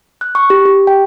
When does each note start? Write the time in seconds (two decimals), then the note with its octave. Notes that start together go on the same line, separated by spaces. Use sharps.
0.21 F#6
0.35 C#6
0.50 G4
0.66 G4
0.87 G5